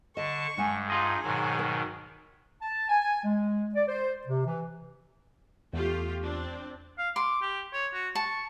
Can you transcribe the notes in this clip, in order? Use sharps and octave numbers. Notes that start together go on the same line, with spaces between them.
D3 D#5 A5 C#6
G2 G#3 F#5 G#5
D#4 F4 G#4 D#5
G#2 B2 D#3 F#3
A#4
A5
G#5
G#3
D5
C5
C3
E3
E2 A3 F4 G4
C4 D4
F5
C6 D6
G4
C#5
F#4
A5 C#6